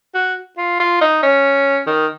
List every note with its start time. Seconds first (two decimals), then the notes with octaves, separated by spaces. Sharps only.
0.15 F#4
0.57 F4
0.80 F4
1.01 D#4
1.23 C#4
1.87 D#3